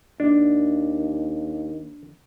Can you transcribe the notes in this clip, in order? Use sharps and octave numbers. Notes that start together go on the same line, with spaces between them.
D#2 D4